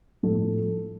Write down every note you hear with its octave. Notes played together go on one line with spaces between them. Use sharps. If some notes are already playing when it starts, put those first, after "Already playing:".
A2 F3 A3 A4